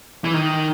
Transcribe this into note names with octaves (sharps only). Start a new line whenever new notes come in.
E3
D#3